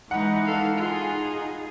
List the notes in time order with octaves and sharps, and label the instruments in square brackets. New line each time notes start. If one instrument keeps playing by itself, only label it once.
[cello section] E3 G#3 D#4 [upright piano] F#5 B5
[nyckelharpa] A4 F5
[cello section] D#4 G#4 [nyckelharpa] F4